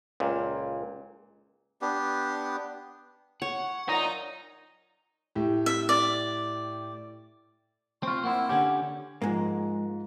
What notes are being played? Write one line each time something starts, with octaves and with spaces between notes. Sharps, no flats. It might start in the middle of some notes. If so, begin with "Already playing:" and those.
C#2 A#2
B3 D4 G4
C#5 F#5
A#2 F#3 D#4 A#5
A2 G4
E5
D5
C4 F4 C#6
A#3 C4 E4 F#5
D3 C#4 G4
G#2 F3 G#3 A#3